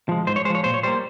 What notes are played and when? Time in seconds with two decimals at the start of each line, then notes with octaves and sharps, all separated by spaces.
0.09 F3 G#3
0.27 G#2 C5
0.36 C#5
0.45 G#3 C5
0.50 F3 C#5
0.64 A#2 C5
0.74 C#5
0.83 G3 A#3 C5